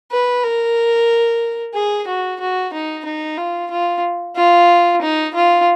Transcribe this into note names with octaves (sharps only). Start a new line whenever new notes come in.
B4
A#4
G#4
F#4
F#4
D#4
D#4
F4
F4
F4
D#4
F4